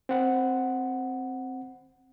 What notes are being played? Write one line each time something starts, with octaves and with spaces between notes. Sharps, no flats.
C4 F#5